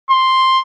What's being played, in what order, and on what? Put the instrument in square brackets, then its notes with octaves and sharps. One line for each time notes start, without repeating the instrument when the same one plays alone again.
[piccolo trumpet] C6